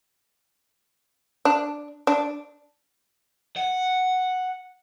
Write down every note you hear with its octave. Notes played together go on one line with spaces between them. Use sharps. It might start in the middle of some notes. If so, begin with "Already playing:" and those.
D4
D4
F#5